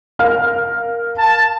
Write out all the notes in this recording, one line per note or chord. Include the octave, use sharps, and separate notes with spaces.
A#4 F5 F6
A5